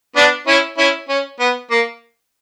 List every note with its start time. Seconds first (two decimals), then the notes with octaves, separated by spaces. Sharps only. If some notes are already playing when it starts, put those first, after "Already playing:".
0.16 B3 D4
0.47 C#4 E4
0.78 C#4 E4
1.09 C#4
1.40 B3
1.71 A#3